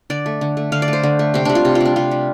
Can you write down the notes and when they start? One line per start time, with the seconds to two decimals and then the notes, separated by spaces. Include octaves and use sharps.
0.10 D3 D5
0.26 A3
0.41 D3
0.57 A3
0.72 D3 F5
0.82 D5
0.88 A3
0.93 C5
1.03 D3
1.19 A3
1.34 C3 C4
1.45 G3 D4
1.55 F4
1.65 C3 G4
1.75 F4
1.80 G3 D4
1.96 C3 F4
2.11 G3